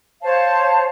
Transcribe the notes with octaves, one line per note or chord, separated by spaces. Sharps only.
C5 C#5 F5 A5